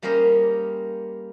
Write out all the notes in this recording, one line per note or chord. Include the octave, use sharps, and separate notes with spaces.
G3 A#3 C#4 A#4 C5 D#5